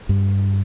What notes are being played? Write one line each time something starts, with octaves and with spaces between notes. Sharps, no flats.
G2